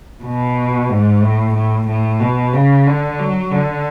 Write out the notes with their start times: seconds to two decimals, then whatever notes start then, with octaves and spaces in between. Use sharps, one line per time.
0.23 B2
0.89 G#2
1.22 A2
1.54 A2
1.88 A2
2.20 B2
2.53 C#3
2.86 D3
3.19 F#3
3.51 D3